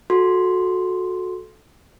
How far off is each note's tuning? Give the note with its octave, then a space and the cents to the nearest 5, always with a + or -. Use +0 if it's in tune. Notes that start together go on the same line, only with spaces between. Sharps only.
F#4 -15 A4 -15 C6 +0